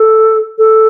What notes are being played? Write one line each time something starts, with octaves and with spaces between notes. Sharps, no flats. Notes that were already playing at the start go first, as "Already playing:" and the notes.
Already playing: A4
A4